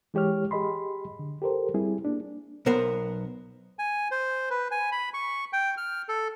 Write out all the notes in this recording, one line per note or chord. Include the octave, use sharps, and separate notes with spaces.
E3 G#3 G4 C#5 F6
G4 G#4 D#5 B5 C6
D3
G4 A4 A#4 C5
G3 C4 E4 G#4
A#3 D4
B1 B3 A#4 C5
G#5
C5
B4
G#5
B5
C#6
G5
F6
A4